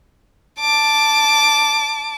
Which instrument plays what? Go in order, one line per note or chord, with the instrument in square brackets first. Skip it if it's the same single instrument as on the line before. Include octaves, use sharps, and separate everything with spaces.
[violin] A5 D6